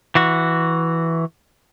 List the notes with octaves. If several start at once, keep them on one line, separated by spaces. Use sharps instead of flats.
E3 F#4